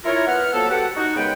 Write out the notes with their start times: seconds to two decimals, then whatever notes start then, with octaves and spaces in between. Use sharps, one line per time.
0.05 E4 F4 A#4 C#5
0.26 B3 F#5 F6
0.53 F3 F#3 A#3 B3 A4
0.70 F#4 G4 A4 B4 F#5
0.96 D#4 F#4
1.16 D#2 C#3 G#3 B3 B4 G5